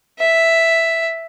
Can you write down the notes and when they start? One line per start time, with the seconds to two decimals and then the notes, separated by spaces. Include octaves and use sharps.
0.19 E5